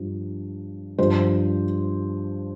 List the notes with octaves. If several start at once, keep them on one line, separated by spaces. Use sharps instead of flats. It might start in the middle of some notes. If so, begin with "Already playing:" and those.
Already playing: G2 F3
G2 F3 C5